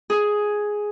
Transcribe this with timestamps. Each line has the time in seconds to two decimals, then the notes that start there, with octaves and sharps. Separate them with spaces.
0.10 G#4